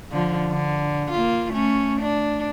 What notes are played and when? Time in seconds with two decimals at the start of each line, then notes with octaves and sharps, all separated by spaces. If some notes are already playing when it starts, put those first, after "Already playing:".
0.12 D3 F3
0.49 D3
1.11 A#3 F4
1.53 A3 C#4
2.01 D4